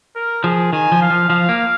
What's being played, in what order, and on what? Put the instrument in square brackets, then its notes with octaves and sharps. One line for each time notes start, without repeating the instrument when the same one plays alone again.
[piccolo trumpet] A#4
[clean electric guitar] F3 [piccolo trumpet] G#4
[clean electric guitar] D#3 [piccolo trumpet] G#5
[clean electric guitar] F3
[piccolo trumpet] F5
[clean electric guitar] F3
[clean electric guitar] F3 [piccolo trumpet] F5
[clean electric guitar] A#3